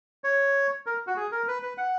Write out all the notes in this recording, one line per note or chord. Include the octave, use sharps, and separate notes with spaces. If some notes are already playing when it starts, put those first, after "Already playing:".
C#5
A#4
F#4
G#4
A#4
B4
B4
F#5